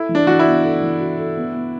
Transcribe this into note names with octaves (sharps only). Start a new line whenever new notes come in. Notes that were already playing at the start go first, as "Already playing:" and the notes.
Already playing: E4 A4
E3
D4
E3 F#4
E4
B3
A4
E3
F#4
A4
B3
B3